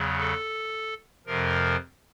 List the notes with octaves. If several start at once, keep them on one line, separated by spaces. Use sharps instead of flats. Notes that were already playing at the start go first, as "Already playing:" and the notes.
Already playing: E2 C#3 F#3
A4
F2 C3 F3 A#4